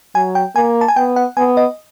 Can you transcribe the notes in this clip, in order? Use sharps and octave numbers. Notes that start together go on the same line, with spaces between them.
F#3 G#5
G5
A#3 G#5
A5
G#5
B3 G5
F#5
B3 G#5
D#5